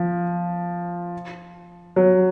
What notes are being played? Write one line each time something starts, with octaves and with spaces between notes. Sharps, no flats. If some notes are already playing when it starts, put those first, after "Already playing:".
Already playing: F3
F#3